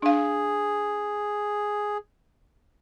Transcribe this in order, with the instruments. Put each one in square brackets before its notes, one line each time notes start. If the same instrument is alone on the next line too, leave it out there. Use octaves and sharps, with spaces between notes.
[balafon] D4 F5 [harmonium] G#4